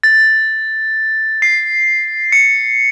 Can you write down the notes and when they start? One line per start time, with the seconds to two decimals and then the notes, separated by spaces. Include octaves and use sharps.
0.03 A6
1.42 C7
2.32 C#7